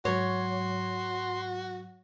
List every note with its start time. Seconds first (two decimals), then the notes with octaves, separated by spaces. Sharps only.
0.05 G#2 F#3 F#4 C#5 C6